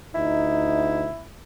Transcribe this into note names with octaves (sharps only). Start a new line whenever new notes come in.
D2 D#4 E4